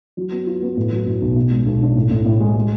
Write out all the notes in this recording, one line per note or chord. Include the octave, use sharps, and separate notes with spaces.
F#3
B3
F4
B3
A2
F#3
A2
B1
B2
G#3
B1
D4
A2
A2
A2
G#3
G#3